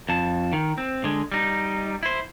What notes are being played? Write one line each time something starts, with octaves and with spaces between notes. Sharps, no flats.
F2 A5
D#3
C4
D3 G#3
G3 D#4
E4 C5